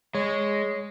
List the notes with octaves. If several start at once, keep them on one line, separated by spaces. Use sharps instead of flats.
G#3 C#5